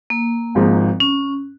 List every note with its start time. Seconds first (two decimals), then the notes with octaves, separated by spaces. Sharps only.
0.10 A#3
0.55 G#1 G#2 F3
1.00 C#4